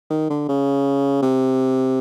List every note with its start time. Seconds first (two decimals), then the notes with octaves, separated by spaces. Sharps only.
0.10 D#3
0.30 D3
0.48 C#3
1.22 C3